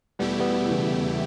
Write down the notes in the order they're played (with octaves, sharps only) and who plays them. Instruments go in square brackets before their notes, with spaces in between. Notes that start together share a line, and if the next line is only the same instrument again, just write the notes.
[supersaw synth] E2 B2 A3 E4 G4 [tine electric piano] G3 B3
[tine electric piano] G3 B3
C#3 E3